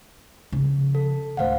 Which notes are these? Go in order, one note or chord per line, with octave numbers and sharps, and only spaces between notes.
C#3 F3
A4
D2 A2 C5 F5 F#5